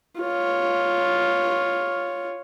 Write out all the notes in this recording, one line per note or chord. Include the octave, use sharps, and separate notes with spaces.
F4 C#5